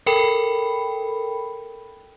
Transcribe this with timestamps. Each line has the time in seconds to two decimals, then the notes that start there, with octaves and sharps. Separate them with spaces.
0.06 A4 A#4 G5 B5